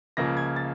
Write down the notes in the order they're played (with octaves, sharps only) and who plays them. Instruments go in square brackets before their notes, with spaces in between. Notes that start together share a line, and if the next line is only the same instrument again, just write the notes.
[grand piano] C#2 C#3 F3 A#3 A#6
G#6
A6